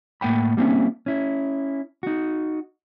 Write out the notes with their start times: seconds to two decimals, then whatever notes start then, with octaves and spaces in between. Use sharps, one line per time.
0.21 A2 A#3 F#5 G5 B5
0.57 G3 A#3 C4 C#4 E4
1.06 C#4 E4
2.03 D#4 F#4